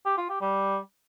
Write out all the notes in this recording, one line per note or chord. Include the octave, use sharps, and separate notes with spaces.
G4
F4
G4
G3